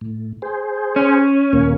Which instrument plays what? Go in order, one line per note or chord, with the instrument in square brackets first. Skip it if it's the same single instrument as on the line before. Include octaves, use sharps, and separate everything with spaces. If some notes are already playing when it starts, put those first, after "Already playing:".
[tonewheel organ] A2
G#4 C5
[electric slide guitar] C#4
[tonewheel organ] D#2 A#2 A#3